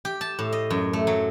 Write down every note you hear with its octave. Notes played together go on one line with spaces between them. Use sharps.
G4
A5
A2
D#5
F#2
A3
F#3